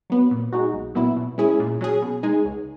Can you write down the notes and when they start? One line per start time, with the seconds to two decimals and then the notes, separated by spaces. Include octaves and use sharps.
0.10 F#3 B3
0.31 A#2
0.52 G#3 D#4 F#4
0.74 B1
0.95 A#2 F#3 B3 E4
1.16 B2
1.38 G#3 C#4 E4 G#4
1.60 A#2
1.81 F#3 C#4 G#4
2.02 B2
2.23 G#3 D#4 G#4
2.45 C#2